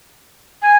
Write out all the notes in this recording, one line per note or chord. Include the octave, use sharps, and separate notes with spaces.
G#5